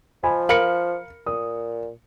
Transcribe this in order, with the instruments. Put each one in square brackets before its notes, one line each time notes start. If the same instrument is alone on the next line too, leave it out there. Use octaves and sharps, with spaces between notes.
[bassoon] F3 [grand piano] D#5 G#5 B5
[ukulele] A#4 B5 [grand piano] F5 C#7
[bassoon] A#2 [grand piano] D#6